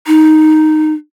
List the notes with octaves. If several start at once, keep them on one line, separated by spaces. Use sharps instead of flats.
D#4